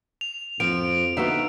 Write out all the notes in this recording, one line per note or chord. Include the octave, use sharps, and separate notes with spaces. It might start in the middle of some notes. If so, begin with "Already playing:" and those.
F7
F2 F3 D7 F7
D3 B3 D#4 F#4 E5 F5